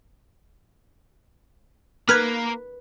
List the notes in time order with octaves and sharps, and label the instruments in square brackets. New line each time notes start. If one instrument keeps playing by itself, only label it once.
[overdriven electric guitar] A#3 A#5 [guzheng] B4 [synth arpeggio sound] F6 F#6 G#6